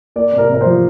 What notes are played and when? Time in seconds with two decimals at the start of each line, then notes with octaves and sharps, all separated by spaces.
0.16 A#3 D5
0.32 C3
0.38 A#4
0.50 C3 A#4
0.61 C5
0.66 F3